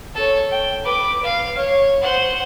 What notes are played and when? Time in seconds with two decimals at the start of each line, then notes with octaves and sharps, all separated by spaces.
0.15 A4 C#5
0.51 G5
0.84 B4 D6
1.23 F5
1.57 C#5
2.01 C5 F#5